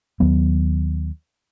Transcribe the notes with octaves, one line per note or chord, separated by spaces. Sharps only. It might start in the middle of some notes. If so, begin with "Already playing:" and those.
D#2 F#3 B3